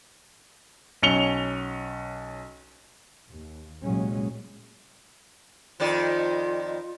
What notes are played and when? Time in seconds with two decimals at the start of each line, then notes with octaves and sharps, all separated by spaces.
1.03 B1 C#4 C#7 F7 G7
3.29 D#2
3.82 C2 A#2 F#3 G#3 C#4
5.80 F2 D#3 F4 D5